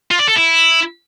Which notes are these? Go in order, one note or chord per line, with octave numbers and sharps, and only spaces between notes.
F4
D5
A4
E4